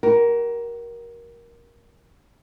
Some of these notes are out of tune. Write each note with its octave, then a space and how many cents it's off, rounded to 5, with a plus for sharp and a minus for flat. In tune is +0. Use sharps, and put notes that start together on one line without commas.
F#4 +45 A#4 +15